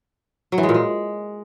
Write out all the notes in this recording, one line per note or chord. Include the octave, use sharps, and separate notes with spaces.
F#3
E3
G#3
A#2
G#3